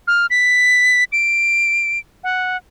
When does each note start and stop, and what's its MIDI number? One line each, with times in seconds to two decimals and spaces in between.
0.08 0.26 89
0.30 1.04 95
1.12 1.99 98
2.24 2.57 78